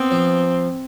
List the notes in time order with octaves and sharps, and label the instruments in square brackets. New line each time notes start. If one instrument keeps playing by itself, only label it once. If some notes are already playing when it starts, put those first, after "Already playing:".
Already playing: [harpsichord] B3 [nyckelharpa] C4
[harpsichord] F3